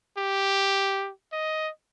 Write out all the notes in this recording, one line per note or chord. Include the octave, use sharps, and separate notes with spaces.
G4
D#5